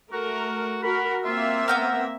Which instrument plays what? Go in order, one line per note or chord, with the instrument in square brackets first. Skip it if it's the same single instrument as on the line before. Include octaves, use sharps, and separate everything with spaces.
[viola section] A3 A#4 [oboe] F#4
[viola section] F#4 A#4 [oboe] B5
[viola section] A#3 C4 E5 [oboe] F4
[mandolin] B3 G5 F6 [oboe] A#5